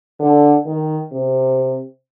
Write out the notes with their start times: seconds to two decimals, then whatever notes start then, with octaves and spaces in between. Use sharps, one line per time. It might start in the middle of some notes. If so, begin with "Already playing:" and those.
0.20 D3
0.66 D#3
1.12 C3